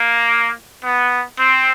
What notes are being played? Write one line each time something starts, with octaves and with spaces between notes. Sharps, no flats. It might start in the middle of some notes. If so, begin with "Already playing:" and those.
Already playing: A#3
B3
C4